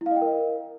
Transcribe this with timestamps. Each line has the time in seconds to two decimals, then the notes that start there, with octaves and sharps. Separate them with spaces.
0.01 E4
0.06 F5
0.11 D#5
0.16 G5
0.21 A#4